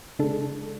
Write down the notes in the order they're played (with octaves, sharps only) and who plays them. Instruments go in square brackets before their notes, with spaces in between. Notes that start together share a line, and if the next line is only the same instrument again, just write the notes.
[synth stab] C#3 G#3 D4 A4